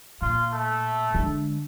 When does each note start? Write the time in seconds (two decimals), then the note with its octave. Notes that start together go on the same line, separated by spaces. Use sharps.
0.22 A#2 F4
0.52 A3
1.14 D3 G#3